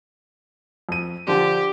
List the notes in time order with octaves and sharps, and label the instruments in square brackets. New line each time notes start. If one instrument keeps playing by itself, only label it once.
[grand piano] F2 D#7
[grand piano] D3 F3 D4 [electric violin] G4